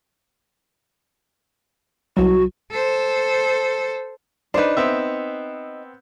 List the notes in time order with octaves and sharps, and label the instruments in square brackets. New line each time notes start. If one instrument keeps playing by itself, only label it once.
[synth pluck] C2 F#3 [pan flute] F#4
[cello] A4 C5
[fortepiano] D4 B4 [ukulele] D#4 C5
[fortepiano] B3 C4 E5